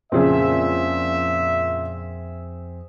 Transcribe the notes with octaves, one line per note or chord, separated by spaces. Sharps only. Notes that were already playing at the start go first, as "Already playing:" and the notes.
F2 A#2 C#3 F3 C4 D4 G#4 E5